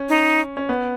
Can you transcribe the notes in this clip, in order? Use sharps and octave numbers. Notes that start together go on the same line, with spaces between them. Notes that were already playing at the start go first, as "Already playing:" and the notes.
Already playing: C#4
D#4
C#4
B3